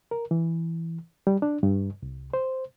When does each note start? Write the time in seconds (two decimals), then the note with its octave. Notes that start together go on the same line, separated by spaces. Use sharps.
0.11 A#4
0.31 E3
1.27 G3
1.42 D4
1.63 G2
2.03 C2
2.34 C5